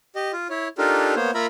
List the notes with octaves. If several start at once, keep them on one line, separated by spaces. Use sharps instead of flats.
G4 D#5
F4
E4 C#5
D4 D#4 F4 G4 A4 A#4
A#3 B3 C5 C#5
A#3 F4 A#4 E5 A#5 B5